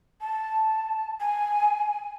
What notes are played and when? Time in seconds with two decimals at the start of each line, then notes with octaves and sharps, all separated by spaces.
0.21 A5
1.20 G#5